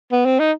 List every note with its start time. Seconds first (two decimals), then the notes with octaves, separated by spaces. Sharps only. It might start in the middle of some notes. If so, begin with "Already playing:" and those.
0.12 B3
0.25 C4
0.40 D#4